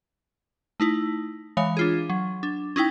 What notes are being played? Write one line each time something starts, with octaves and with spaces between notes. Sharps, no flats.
A3 D#4 E4
E3 G#3 C#5 F5
D4 F4 G#4
F#3
D4
C#4 D#4 E4 G5